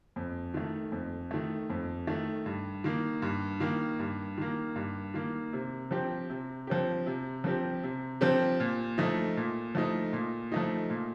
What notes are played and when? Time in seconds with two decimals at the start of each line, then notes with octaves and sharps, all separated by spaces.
0.16 F2
0.54 D#3 A3
0.92 F2
1.31 D#3 A3
1.70 F2
2.07 D#3 A3
2.46 G2
2.84 D#3 A#3
3.22 G2
3.60 D#3 A#3
3.99 G2
4.38 D#3 A#3
4.76 G2
5.14 D#3 A#3
5.53 C3
5.91 F3 C4 G4
6.30 C3
6.67 F3 C4 G4
7.06 C3
7.44 F3 C4 G4
7.83 C3
8.21 F3 C4 G4
8.60 A#2
8.98 F3 A3 D#4
9.37 A#2
9.75 F3 A3 D#4
10.13 A#2
10.52 F3 A3 D#4
10.90 A#2